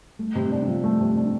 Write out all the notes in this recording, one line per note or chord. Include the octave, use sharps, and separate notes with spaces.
A3
C3
D4
F3
A3
C3
D4